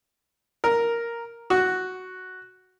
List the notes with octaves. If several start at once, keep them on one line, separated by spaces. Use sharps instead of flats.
A#4
F#4